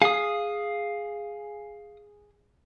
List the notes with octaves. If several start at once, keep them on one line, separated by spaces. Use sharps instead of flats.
G#4 F5 D#6